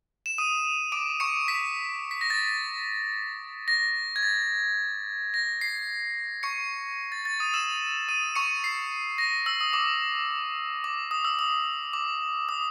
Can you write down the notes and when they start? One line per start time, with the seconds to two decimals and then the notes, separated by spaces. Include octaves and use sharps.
0.26 E7
0.38 D#6 D#7
0.92 D6 D7
1.20 C#6 C#7
1.48 B6
2.11 B6
2.21 A#6
2.30 A6
3.68 A#6
4.16 G#6
4.23 A6
5.34 A#6
5.61 C7
6.43 C#6 C#7
7.12 A6
7.25 A6
7.40 D#6 D#7
7.54 E6 E7
8.08 D#6 D#7
8.36 C#6 C#7
8.64 C7
9.18 A#6
9.46 E6
9.61 D#6
9.73 D6
10.84 D6
11.11 D#6
11.25 E6
11.39 D#6
11.93 D6
12.49 D#6